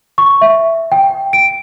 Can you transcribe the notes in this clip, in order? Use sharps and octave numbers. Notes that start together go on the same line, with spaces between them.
C#6
E5
G5
D7